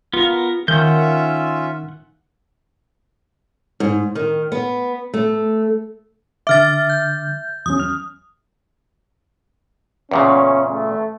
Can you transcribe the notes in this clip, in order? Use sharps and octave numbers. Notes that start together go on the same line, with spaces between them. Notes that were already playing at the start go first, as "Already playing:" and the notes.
B3 F4 A#4
D#3 C#4 F4 E5 F#5 G6
G#2
D#3
B3
A3
D3 E5 D6 F6 A6
G6
E2 F#3 C#4 D#6
F6
E2 A#2 C#3 C#4
A3